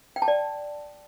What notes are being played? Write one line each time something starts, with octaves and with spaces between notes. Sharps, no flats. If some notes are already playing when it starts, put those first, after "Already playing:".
G5
A5
D5